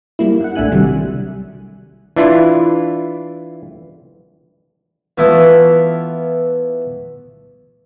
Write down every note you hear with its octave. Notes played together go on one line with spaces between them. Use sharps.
G3 A#3 E4
G2 F#5
A#1 A3 D4 E5 G#5 F#6
C3 D#3 F#3 G3
E3 D4 E4 F4
E3 A3 B3 E4 F4